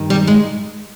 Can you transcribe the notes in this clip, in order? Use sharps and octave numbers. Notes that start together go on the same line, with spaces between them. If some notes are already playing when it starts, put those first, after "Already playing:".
Already playing: G2 D#3
G3
G#3